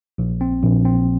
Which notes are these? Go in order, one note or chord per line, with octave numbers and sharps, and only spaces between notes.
A#1
C4
A#1
C4